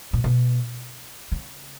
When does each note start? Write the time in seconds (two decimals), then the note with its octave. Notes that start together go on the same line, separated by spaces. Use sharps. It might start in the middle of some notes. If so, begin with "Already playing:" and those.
0.13 A#2
0.24 B2
1.32 C#3